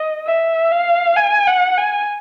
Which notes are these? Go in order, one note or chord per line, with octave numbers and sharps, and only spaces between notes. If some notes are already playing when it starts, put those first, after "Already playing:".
Already playing: D#5
E5
F5
G#5
F#5
G#5